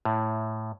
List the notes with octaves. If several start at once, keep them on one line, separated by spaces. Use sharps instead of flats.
A2